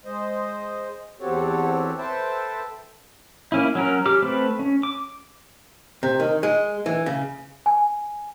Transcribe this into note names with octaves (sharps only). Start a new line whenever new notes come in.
G#3 C5 D#5
E2 C4 F#4 G4 A4 C#5
A4 B4 C5 E5 G5 A5
A#3 C#4 E4
F#3 C#4 A#4
G4 D6 F6
A3 C4 B4
C#4
D6
C3
D#3
G#3
E3
C#3
G#5